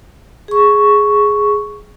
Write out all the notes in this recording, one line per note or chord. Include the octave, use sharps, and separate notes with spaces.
G#4 C#6